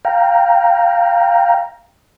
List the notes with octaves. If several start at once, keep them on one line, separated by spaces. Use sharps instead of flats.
F5 G5 A#5